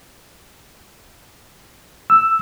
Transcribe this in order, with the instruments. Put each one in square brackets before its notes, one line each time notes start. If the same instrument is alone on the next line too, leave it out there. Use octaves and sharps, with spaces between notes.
[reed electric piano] E6